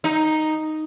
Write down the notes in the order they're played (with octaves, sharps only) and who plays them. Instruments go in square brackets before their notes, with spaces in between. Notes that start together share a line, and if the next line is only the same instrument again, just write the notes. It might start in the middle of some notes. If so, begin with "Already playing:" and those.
[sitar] D#4